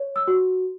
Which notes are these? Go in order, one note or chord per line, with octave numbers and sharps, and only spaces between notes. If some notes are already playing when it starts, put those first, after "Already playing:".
Already playing: C#5
E6
F#4